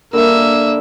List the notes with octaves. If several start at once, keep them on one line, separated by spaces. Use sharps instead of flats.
D3 G3 A#3 A#4 E5